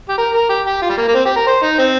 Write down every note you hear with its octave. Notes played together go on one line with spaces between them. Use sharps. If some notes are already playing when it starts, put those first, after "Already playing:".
G4
A#4
A#4
G4
G4
F4
G3
A#3
A#3
C4
G4
A#4
C5
D#4
C4